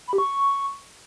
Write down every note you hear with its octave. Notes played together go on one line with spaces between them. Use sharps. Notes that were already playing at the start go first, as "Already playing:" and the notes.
B5
G4
C#6